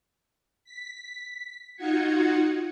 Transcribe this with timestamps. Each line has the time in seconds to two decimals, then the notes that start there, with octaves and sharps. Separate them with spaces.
0.64 B6
1.76 D#4 F4 F#4 F#5 G#6 C#7